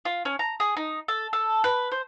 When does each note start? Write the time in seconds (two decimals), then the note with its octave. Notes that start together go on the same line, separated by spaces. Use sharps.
0.05 F4
0.25 C#4
0.39 A#5
0.60 G#4
0.77 D#4
1.08 A4
1.33 A4
1.64 B4
1.92 C5